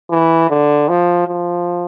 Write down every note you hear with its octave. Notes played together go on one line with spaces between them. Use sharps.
E3
D3
F3
F3